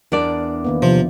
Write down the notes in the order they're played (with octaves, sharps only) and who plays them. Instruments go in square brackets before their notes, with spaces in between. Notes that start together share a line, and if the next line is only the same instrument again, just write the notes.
[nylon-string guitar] E2 D4 D5 [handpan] E3 A#4
[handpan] D#3 A#3 B3
[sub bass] C3 [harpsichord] F3